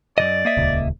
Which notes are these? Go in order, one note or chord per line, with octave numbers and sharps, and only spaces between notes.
F#2 C#3 D5 D#5
A#3 D#5 E5
D#1 C#2